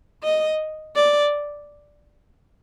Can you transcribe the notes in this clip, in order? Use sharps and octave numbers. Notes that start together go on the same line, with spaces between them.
D#5
D5